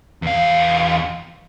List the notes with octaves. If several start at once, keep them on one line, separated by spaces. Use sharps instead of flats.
E2 F5